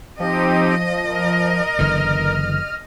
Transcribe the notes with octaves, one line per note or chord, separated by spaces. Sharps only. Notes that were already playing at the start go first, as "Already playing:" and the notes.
F3 C4 D#4 G4 D#5
A#4
F#1 D3 E3 F6